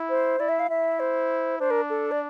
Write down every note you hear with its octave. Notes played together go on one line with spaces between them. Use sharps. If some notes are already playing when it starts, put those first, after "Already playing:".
Already playing: E4
C5
E4 D5
E5
F5
E4 E5
C5
D4 C5
A#4
A4
D5